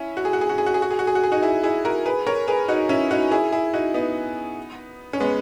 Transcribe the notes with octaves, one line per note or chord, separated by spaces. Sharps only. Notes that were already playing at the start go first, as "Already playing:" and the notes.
Already playing: C#4 E4
F#4
G#4
F#4
G#4
F#4
G#4
F#4
G#4
F#4
G#4
F#4
G#4
F#4
G#4
D#4 F#4
E4 G#4
E4 G#4
F#4 A#4
G#4 B4
A#4 C#5
G#4 B4
D#4 F#4
C#4 E4
D#4 F#4
E4 G#4
E4 G#4
D#4 F#4
B3 D#4
C#4
G#3 B3